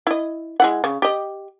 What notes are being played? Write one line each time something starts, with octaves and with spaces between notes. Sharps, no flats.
E4 D#5
G#3 E4 F#5
C#3
G4 D#5